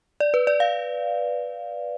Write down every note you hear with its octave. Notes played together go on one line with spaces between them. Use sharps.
D5
B4
D5
F5